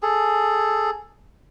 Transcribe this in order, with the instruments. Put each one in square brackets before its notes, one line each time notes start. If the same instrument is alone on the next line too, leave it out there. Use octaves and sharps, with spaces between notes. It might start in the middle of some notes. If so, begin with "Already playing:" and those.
[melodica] G#4 A4